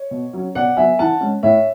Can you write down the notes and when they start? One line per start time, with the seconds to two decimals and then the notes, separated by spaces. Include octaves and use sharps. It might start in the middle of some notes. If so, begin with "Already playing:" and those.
Already playing: C#5
0.11 B2
0.33 F#3 C#4
0.55 B2 D5 F#5
0.77 F#3 B3 E5 G#5
0.99 E3 F#5 A5
1.21 G#3 C#4
1.43 A2 C#5 E5